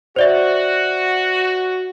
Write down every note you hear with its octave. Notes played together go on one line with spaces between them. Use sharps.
F#4 C5 D5 E5